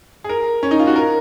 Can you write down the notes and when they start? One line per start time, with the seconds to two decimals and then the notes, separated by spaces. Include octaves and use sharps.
0.24 G#4
0.29 A#4
0.63 C#4
0.71 D#4
0.79 F4
0.87 F#4
0.96 A#4